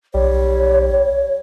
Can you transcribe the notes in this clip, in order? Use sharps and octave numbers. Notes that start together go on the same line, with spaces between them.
B1 G3 C#5